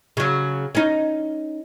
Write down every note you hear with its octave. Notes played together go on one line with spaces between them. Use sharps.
C#3 F#3
C#4 D#4